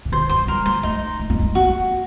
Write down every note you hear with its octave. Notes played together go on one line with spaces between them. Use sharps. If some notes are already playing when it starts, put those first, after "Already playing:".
C3
D3 C5
F#3 C5
G3 A#4
A#3 C5
A3 D#4
A3
A#3
A3
A#3 F#4